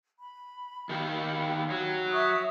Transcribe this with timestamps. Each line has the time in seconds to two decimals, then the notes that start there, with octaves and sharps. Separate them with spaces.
0.20 B5
0.89 D#3 G4 F5
1.70 F#3
2.12 E5 C#6 D#6